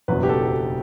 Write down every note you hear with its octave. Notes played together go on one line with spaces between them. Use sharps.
F#1 E2 B2 F#3 B4
G4
A4